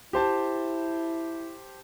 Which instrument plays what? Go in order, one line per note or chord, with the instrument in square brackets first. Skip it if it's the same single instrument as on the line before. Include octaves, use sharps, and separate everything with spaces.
[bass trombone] E4 [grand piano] G4 C5 A5